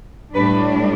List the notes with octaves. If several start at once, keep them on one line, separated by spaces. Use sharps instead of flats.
A2 G3 D4 B4